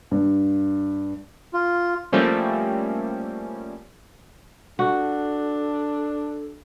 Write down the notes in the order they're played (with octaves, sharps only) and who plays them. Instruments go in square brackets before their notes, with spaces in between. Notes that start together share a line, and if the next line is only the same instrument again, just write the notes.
[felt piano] G2
[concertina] F4
[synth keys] F3 G3 A3 A#3 C4 C#4
[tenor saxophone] D4 [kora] F#4 [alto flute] A4